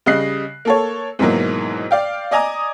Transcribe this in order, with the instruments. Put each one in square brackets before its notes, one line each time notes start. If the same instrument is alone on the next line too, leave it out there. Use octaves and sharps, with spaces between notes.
[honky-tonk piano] C#3 G3 D#5 F#6 C7
A#3 A4 C#5
G#2 B2 D#3 E3 F#3 A#3
D5 F5 G5
D5 D#5 G#5 A#5 D6 D#6